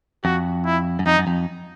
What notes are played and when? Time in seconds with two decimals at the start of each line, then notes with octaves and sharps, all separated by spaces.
0.24 F2 F#4
0.66 E4
0.99 F#2
1.06 F2 D#4
1.18 F#2
1.27 F2